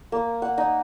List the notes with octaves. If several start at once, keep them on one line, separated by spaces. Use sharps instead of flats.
A#3
F#5
D#4